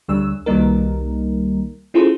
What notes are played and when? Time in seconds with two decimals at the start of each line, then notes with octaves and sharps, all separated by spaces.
0.08 D2 D3 G3 E6
0.46 C2 D#3 G3 A#3 D#4 A#4
1.94 C#4 E4 F4 G#4 A4 C5